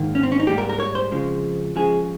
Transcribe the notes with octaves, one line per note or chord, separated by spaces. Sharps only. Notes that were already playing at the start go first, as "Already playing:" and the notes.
Already playing: G#2 D#3 A#3
C#4
C4
C#4
D#4
G#2 G3 A#3 G4
A#4
A#4
C#5
C5
F2 C#3 F3 G#3
C#2 C#3 F3 G#3 G#4